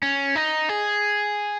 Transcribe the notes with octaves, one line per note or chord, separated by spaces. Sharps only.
C#4
D#4
G#4